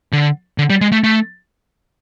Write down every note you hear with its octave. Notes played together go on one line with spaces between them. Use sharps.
D3
D3
G3
G#3
A3
A3